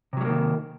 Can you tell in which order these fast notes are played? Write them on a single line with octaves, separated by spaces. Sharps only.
C3 F#3 G3 A#3 D#3